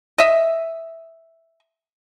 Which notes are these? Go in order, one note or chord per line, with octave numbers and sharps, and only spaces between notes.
D#5 E5